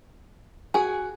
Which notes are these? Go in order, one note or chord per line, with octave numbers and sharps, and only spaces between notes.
F#4 G#4 G#5